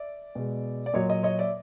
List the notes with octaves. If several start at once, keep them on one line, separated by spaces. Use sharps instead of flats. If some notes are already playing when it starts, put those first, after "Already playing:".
Already playing: D5 E5
B2 G#3
D5
A#2 F#3 C#5 D#5
C#5 D#5
C#5 D#5
D5 E5